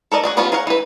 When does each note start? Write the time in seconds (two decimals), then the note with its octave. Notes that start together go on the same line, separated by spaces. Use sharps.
0.12 A4 A#4 D5 D#5
0.24 F#4 G#4 D5
0.37 F3 G3 B3 C#4 F4
0.52 G#4 A#4 C#5 F5 F#5
0.67 E3 B4